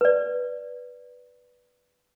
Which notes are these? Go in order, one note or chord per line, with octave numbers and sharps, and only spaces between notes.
B4 D5